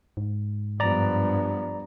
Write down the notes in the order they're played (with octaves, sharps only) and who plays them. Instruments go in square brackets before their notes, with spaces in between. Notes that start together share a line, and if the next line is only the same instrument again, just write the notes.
[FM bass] G#2
[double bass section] G2 [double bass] F3 B3 [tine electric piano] D5 A#5